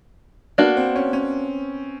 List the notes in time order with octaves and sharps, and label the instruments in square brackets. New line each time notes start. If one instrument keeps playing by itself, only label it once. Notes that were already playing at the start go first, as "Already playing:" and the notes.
[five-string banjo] A#3 D4 F#4 [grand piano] B3
[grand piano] C4
C#4
C#4